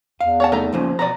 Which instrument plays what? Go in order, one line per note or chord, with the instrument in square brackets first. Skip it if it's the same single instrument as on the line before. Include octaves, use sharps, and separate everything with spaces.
[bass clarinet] E2 [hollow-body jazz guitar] F5
[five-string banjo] C#5 F#5 A5
[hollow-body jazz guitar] C2 [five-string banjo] A3 D#4 A#5
[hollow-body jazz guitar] F2 A#2 C#3 [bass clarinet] F3
[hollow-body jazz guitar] B2 A#5 [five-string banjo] B3 D5